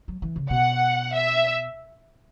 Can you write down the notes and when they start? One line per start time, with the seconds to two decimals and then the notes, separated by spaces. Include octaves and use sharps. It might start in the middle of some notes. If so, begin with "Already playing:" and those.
0.08 F#3
0.22 E3
0.36 C#3
0.50 B2 F#5
1.14 E5